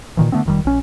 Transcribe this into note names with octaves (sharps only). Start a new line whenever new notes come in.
A#2 D#3 E3
D3 A3 B3 C4
F1 D#3 G3
A#1 C#4